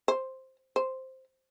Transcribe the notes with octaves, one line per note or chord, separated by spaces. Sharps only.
C5
C5